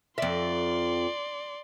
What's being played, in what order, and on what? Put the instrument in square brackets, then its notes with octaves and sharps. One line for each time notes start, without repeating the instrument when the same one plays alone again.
[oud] F2 E5 [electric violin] D5 C6